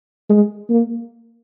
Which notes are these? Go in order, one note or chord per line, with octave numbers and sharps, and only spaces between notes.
G#3
A#3